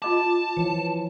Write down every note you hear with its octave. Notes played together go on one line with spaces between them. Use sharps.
F4 D#5 A5 D6
E3 F3 C#5